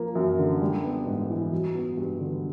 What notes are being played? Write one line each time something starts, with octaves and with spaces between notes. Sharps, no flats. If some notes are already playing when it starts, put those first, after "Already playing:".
Already playing: F3 A#3
F#2
D3
G3
B3
G#2
E3
F#3
B3
G2
D3